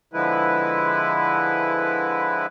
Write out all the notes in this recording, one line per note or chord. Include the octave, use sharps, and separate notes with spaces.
D3 F3 G#3 E4 B4